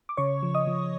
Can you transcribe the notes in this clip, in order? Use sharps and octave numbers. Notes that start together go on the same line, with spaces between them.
D6
C#3 C#5 C#6
F3
D#5 D#6
F3